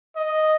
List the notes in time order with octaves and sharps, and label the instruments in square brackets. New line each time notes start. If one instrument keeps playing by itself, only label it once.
[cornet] D#5